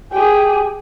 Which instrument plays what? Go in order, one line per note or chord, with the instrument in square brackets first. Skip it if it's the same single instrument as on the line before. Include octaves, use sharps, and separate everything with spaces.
[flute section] G4 G#5 [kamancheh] G#4 G5